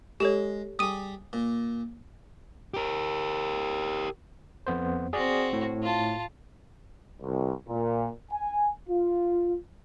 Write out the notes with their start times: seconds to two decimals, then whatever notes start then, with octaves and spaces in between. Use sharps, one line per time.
0.20 G#3 G4 A4 C#5
0.79 G3 G#4 D#6 D#7
1.33 A#2
2.74 G4 A#4
4.67 F2 B3 C5
5.13 C4 F#4 G#4 D5
5.53 A2
5.83 F4 A5
7.22 C2
7.69 A#2
8.32 G#5
8.88 F4